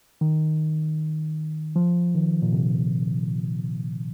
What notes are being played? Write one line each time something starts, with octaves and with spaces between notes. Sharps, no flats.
D#3
F3
D#3
A#2
C3